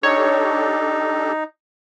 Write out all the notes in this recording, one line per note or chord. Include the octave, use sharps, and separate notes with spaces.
D4 D#4 G4 A4 C#5